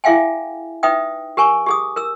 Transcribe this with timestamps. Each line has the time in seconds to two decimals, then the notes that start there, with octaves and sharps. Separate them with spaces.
0.04 E4 G#4 E5 F5 G5 G#5
0.83 D#4 B4 E5 G5 D#6
1.37 G4 A#4 G#5 C#6
1.66 G4 G#4 D#6
1.96 A#4 E6